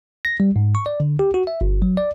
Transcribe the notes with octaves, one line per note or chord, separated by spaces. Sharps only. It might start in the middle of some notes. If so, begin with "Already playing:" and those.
A#6
G3
G#2
C#6
D5
D3
G4
F#4
E5
G1
F#3
D5